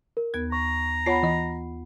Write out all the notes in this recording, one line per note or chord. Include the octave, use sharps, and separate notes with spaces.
A#4
D#2 B3 G#6
A#5 C#6
B3 F4 C#5 F#5 A5 B5 C7
E3 D#5